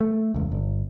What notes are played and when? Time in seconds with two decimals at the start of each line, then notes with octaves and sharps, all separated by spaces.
0.01 A3
0.34 E1 C#2
0.52 G1